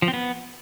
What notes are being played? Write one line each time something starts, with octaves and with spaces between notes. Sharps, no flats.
F3
C4
B3